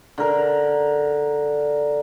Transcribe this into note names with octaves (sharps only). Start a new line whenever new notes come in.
D3 A#4